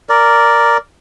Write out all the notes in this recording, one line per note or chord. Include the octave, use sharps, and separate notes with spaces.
A#4 D5